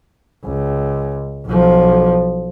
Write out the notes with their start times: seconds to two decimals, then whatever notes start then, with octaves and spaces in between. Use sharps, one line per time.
0.45 C#2
1.46 B1 F3